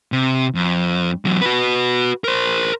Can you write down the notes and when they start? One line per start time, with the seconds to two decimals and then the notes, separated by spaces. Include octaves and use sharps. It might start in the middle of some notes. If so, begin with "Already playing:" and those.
0.12 C3
0.55 F2
1.25 E2 F#3
1.41 F#4 B4
2.24 A#4 C5